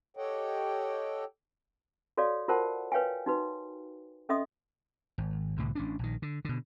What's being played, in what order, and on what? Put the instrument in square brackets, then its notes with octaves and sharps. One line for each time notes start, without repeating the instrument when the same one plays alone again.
[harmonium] G4 A4 C#5 D#5 F#5 G5
[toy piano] F#4 A4 C#5 D5 F5
F4 F#4 A#4 C5 F#5 A5
B4 C#5 F5 G5 G#5
D#4 F#4 B4
C#4 A4 D#5 E5 C6 D#6
[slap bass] G#1
C2 A2 D3
A1 C#4 D4
A#1 D#3
D3
B2 D3